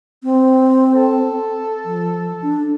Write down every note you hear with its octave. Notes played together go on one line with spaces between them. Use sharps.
C4
A4
F3
D4